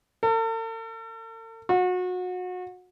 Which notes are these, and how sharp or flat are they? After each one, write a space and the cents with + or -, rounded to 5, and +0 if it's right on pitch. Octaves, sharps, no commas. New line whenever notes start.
A4 +45
F#4 -30